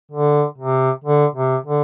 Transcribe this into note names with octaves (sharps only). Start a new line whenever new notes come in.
D3
C3
D3
C3
D3